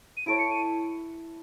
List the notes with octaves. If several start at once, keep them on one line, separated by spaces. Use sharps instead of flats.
D#7
E4 A4 C#5 D7
C#7
D#7